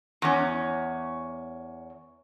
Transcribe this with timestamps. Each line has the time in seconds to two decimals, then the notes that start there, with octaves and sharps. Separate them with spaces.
0.22 E2 C#4